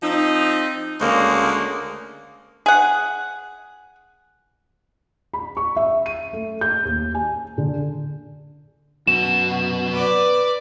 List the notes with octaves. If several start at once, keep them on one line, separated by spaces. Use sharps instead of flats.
F3 C4 D#4
D2 C#3 G#3 A#3 C#4
G#4 F#5
B5
C#6
E5
D#7
A3
G6
D#2
G#5
D3
F#2 B3 F#4 E7
B4 D5 D6